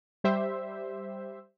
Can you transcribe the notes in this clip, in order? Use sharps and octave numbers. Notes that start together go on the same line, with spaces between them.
G3 G4 C5 E5